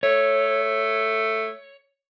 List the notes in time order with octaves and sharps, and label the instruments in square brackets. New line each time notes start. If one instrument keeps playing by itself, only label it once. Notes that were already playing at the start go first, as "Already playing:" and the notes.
[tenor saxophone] A3 [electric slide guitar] C#5